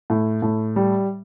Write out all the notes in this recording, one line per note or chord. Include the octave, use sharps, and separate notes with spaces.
A2
A2
G3